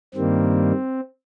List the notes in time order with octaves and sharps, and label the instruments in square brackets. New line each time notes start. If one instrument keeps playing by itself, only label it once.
[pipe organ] G2 D#3 G3 A#3 C4